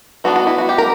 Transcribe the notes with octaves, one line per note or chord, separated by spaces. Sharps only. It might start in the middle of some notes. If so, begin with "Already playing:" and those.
E3 B3 D4 F#4
F#4
E4
F#4
G4
A#4